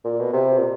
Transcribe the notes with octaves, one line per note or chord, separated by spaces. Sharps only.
A#2
B2
C3
A#2